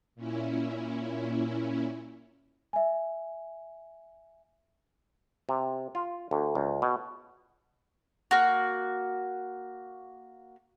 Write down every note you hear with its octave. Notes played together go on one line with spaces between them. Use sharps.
A#2 C#4 E4
E5 G#5
C3
F4
D2
C#2
B2
A#3 F#4